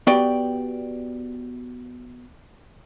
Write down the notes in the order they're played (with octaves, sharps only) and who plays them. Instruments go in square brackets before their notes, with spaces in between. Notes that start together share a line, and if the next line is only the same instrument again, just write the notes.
[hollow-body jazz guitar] B3 F#4 G4 B4 D5 G5